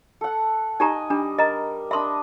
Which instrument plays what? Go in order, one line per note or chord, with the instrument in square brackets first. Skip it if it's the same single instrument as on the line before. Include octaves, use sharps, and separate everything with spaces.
[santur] A4 F#5
[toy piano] D#4 G4 A#5 [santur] D#5 G#5
[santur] G3 [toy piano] D4
[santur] A#4 [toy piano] D#5 A#5
[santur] D4 D#5 B5 [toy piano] E5 C6